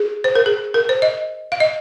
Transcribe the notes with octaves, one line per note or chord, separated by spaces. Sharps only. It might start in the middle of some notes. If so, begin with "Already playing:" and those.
Already playing: G#4
C5
A#4
G#4
A#4
C5
D#5
F5
D#5